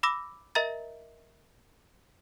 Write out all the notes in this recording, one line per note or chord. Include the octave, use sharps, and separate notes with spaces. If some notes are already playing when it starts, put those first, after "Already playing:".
B5 D6 E6 A#6
A#4 D#5 E5 A#5 A6